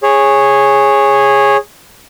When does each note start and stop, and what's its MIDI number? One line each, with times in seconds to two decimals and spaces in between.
0.03 1.57 68
0.03 1.57 73